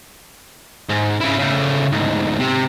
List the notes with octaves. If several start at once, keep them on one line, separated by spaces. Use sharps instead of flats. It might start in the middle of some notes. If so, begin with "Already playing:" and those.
G#2
C#3 E4
C#3 A3
D2 G#2
C3